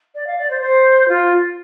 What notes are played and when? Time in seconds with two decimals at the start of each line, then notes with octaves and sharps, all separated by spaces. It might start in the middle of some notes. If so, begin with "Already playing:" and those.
0.15 D5
0.27 F5
0.38 D5
0.50 C5
0.61 C5
1.08 F4